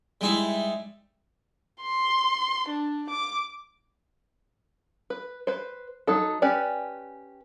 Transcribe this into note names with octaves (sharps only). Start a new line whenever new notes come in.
G3 G#3 D#4 E4
C6
D4
D6
B4
B4 C5
F#3 D#4 A4
C#4 G4 B4 D5